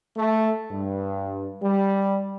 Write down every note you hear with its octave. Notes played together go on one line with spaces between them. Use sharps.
A3
G2
G3